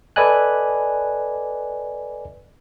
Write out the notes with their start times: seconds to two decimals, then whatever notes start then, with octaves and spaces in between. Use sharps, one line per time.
0.16 A4 B4 D5 D#5 G#5 F#6